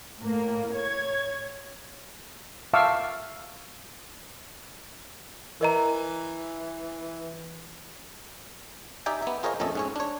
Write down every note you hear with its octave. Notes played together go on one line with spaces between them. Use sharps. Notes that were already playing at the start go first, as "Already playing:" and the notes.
A2 A#3
C#5 G#6
E5 F5 A5 C#6 D6 E6
E3 A#4 D#5 A#5
D#4 G4 D5 E5 G5 G#5
B3 E5
F4 G#4 A#4 C5 C#5 D#5
A#1 F2 A3 C#4 A4 D#5
G#2 C#4 C#5
D4 C#5